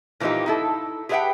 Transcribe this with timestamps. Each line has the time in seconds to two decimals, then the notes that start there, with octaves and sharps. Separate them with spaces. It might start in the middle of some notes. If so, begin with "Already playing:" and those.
0.20 A#2 E3 F3 A#3 D#4 G4
0.46 D#4 E4 A4
1.09 G4 G#4 B4 E5 F#5 G5